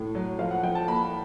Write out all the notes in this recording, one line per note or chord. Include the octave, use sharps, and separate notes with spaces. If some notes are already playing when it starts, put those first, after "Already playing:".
Already playing: A2 A3
F#3
F3 F5
F#5
F3 G5
A5
A#3 B5